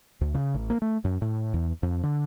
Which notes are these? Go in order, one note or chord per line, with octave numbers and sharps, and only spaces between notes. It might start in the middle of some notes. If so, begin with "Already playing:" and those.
D2
C#3
A1
A#3
A3
F#2
A2
E2
F2
D3